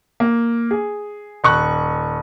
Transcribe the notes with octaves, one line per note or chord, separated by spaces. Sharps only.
A#3
G#4
D#1 C#6 F#6